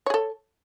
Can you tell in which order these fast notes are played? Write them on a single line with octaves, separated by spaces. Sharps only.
C#5 G#4 A4